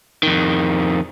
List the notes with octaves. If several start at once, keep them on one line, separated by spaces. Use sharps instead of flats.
F2 D#3